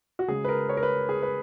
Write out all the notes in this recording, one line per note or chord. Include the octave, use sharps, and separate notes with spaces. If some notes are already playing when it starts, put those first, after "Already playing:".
F#4
C#3 G#3 G#4
B4
A#4
C#5
A#4
B4
G#4
B4